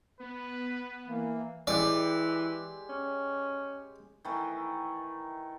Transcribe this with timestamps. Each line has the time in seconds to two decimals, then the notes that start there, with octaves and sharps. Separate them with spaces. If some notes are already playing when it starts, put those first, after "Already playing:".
0.20 B3 B4
1.07 E3 A#3
1.67 E3 G#3 G4 D5 D6
2.89 C#4
4.25 D#3 E3 A3